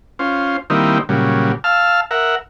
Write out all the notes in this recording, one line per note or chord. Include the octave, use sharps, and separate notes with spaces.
C#4 F4 C5
D#3 G3 A#3 C4 D#4 E4
A#2 C#3 F#3 G3
F5 A5 E6 F6
A#4 E5 F#5